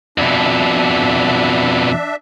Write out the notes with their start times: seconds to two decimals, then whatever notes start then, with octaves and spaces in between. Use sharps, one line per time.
0.18 F2 B2 D4 E5